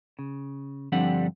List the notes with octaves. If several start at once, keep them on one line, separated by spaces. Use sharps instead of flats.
C#3
G2 D3 F3 G3 C4 F#5